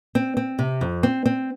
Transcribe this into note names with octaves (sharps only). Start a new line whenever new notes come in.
C4
C4
C3
F2
C4
C4